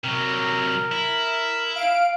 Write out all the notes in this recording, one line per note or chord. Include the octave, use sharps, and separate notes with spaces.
C3 F#3 A#4
E4
F5 D7